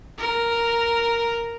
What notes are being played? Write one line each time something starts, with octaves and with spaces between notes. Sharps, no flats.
A#4